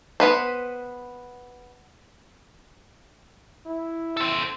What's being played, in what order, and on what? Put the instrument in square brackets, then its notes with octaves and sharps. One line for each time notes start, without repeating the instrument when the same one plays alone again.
[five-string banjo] B3 B4 C5
[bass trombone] E4
[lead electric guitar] A4 C5